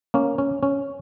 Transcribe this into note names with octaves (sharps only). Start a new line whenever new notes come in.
A#3 C#4
C#4
C#4